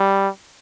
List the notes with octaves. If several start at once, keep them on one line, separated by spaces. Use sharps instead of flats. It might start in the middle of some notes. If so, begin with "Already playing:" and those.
Already playing: G3